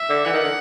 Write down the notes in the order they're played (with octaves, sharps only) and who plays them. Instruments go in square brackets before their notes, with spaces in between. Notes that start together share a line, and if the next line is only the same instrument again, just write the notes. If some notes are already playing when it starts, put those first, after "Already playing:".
Already playing: [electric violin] E5
[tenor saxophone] D3
[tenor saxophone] E3 [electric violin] F#5
[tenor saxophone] D#3
D3